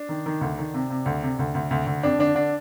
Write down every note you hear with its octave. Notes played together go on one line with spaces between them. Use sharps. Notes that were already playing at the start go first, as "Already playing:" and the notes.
Already playing: D4
D#3
D#3
D2
D#3
C3
C3
D2
C3
D2
D2
D2
D2
F2 D4
D3 D4
D3 D4